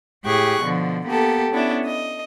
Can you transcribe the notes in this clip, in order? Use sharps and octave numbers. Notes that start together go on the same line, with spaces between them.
A2 G4 G#4 C#6 F#6
B2 D3 F3
A#3 B3 G4 A4
B3 C#4 D4 E4
D#5